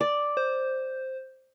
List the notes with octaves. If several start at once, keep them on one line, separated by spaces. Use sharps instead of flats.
D5
C5